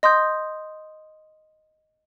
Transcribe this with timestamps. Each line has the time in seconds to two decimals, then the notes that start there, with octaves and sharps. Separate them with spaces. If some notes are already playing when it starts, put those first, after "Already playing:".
0.03 D#5 C6 D#6 G6